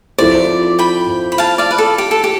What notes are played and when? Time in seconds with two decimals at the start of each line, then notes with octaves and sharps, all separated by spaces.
0.18 F3 C4 E4 A4 C5 D5
0.79 G5 B5
1.32 B5
1.38 F5 A5
1.58 D5 F5
1.71 B4
1.78 A4
1.98 G4
2.11 A4
2.24 G4